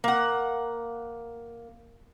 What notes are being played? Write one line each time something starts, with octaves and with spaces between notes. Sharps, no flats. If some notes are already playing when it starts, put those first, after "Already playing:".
A#3 F#5